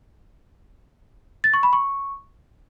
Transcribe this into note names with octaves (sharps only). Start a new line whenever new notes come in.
A6
C#6
B5
C#6